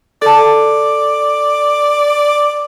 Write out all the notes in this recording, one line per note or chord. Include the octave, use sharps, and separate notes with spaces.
A4 D5 A5